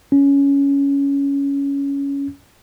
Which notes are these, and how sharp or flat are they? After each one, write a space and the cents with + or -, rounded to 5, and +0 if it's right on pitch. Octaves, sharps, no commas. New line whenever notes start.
C#4 +10